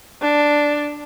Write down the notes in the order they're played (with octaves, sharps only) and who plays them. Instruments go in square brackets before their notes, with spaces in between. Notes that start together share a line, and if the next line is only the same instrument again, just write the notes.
[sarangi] D4